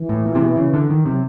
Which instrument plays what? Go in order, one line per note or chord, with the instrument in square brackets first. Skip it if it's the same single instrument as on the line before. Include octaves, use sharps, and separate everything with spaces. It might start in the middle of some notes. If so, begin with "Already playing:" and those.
Already playing: [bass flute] E3
[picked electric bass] A2
A#2
C3
B2
C#3
D3
D#3
[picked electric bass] C3 [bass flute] F#3